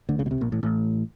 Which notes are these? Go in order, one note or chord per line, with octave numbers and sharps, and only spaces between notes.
D2 D3
C#2 C#3
B2
C2 C3
A#1 A#2
A1 A2
A1 A2